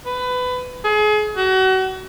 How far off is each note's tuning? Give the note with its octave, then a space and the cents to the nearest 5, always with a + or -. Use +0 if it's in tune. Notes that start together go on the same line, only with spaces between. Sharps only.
B4 +20
G#4 +30
F#4 +35